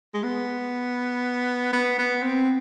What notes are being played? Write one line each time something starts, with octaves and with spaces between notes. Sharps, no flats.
G#3
B3
B3
B3
C4